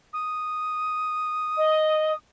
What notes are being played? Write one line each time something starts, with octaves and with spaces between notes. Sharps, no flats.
D#6
D#5